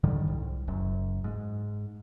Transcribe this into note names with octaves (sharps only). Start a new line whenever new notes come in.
G#2 D3 D#3 G3
C2
F#1 F#2
G#2